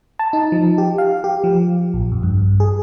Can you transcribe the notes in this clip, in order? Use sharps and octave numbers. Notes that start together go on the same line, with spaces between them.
A5
D#4
F3
G4
F5
G4
F3
A#1
F2
G2
G#4